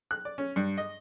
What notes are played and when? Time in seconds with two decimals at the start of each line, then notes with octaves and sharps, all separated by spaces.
0.11 F#6
0.25 D5
0.38 C#4
0.56 G2
0.78 D#5